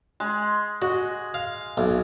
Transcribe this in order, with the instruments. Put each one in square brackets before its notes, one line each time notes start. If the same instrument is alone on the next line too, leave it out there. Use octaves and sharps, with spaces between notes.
[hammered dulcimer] G#3
[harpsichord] F#4 [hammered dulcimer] D#5
[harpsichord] F5
B1